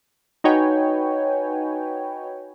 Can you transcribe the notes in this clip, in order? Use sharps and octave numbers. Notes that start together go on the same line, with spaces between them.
D#4 F#4 B4 C#5 G5 G#5